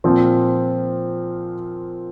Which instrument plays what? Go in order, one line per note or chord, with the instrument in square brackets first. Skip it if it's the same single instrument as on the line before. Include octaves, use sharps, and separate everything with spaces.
[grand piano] A#2 F3 C4